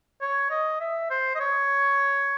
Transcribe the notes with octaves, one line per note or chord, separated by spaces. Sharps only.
C#5
D#5
E5
C5
D#5
C#5